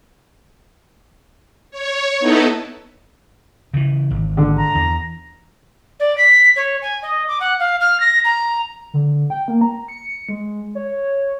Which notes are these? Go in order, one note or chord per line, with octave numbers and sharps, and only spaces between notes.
C#5
B3 D#4 E4 A4
C#3 E3
G#1
D3
A#5
E2
D5
B6
C#5
G#5
D#5
D6
F#5
F5
F6
A#6
A#5
D3
G5
A#3
A#5
C#7
G#3
C#5